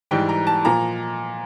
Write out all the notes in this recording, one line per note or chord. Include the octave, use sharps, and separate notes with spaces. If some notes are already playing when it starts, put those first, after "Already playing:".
G#2 E3 G3 G5
A#5
A5
A#2 F3 A#5